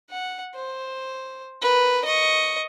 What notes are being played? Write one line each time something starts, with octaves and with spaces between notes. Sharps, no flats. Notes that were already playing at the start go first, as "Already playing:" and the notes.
F#5
C5
A#4 B4
D#5 C#6